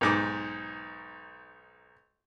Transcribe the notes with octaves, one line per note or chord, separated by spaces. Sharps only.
B1 G#2 D6